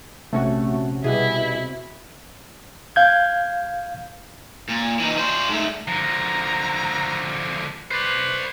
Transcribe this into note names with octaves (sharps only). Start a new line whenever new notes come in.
A#1 C3 A3 C#4 F#4
B2 G3 B3 E4 G#4
F5 G6 G#6
A#2
E3 D#4
D4 C5
G#2 A3
D3 F3 A#5
B4 C5 D5